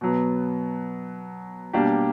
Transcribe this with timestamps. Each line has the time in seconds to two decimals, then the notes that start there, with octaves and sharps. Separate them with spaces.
0.01 B2 F#3 B3
1.73 B2 G3 A#3 D4 G4